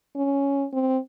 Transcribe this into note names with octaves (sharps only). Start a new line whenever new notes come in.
C#4
C4